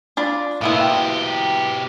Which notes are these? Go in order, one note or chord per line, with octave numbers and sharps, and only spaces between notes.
D4 F4 B5
A2 A#3 B3 E4 F4
B2 G4